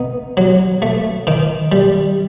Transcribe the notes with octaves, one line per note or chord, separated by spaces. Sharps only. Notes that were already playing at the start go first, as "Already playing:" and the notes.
Already playing: B3 D#4
F#3
A3
D#3
G3